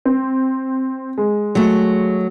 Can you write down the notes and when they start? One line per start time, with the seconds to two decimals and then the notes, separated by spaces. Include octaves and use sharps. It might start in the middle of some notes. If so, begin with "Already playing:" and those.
0.05 C4
1.18 G#3
1.55 F#3 A3